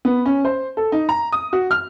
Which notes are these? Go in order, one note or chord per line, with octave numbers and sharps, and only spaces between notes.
B3
C#4
C5
A4
D#4
A#5
D#6
F#4
F6